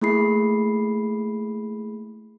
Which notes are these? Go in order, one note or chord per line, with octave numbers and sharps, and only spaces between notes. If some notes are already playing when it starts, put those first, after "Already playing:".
A3 A#3 E4 G#4 B5 C7